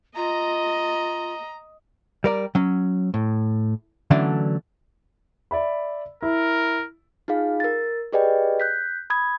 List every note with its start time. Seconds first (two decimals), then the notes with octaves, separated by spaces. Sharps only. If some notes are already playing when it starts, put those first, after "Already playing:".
0.16 F4 D#5 A#5
2.24 G3 A#4 D5
2.55 F#3 C#4
3.14 A2
4.11 D3 E3 F#3 A3 C#4 D4
5.51 D5 E5 B5
6.22 E4 A#4
7.28 D#4 F4 G#4 F5
7.60 A#4 A6
8.12 G4 G#4 B4 D5 D#5 G5
8.60 F#6 G6 B6
9.10 B5 D#6 G#6